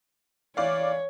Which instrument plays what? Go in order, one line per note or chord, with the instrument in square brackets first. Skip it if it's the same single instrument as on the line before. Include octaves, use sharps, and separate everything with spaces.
[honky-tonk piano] E3 D5 F5 [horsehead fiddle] C#5